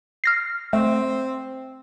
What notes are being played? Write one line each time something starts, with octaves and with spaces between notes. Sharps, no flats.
F6 A#6 C7
A3 C4